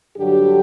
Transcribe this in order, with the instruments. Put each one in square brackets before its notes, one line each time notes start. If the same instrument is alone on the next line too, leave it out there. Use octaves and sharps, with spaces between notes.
[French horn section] G2 D3 F#3 G4